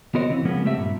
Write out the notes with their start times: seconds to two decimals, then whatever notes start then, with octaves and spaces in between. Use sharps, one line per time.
0.15 B3 F#4 A#4 C5 C#5 D#5
0.28 C#3 E3 C4
0.45 C#3 F3 G#3 A#3 B3 C#4
0.65 A3 C4 G4 E5
0.77 G2 A#2